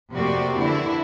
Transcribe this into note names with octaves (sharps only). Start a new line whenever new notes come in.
F2 C3 A#3 F#4 G4 D5
D3 E3 E4